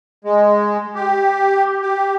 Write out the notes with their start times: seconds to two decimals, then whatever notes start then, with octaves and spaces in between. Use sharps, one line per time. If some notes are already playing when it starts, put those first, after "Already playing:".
0.24 G#3
0.95 G4
1.82 G4